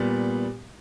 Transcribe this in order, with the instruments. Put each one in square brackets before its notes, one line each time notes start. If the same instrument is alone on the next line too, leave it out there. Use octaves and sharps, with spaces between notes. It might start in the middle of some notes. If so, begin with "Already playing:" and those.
Already playing: [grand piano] A#2 G3 B3